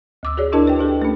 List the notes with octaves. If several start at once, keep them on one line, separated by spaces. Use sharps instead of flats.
D2 D6 E6
F#4 G#4 C#5 D5
D4 E4 F#4 A#4 D#5 A5
B4 G5
D4 G4 A4
A3 C#4